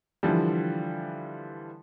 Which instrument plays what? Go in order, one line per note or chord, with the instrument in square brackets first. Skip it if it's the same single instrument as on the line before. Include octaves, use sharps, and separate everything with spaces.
[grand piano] D3 E3 F3 G3